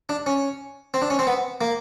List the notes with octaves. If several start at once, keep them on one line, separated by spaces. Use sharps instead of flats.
D4
C#4
C4
D4
C#4
C4
B3
A#3